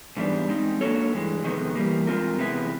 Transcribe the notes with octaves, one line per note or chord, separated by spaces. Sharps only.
G#2 E3 G3 B3 D4
G#3 C4 D#4
A#3 D4 F#4 A4 C#5
G2 E3 G#3
F2 C3 D#3 G#3 B3
E3 G3 A#3
G#3 C4 F4 A#4
C3 E3 G#3 B3 E4